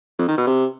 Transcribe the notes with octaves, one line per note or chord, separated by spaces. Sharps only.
F2
D#3
B2
C3